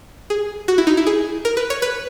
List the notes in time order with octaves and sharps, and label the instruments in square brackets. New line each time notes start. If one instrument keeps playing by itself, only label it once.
[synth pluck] G#4
F#4
E4
D#4
E4
G#4
A#4
B4
C#5
B4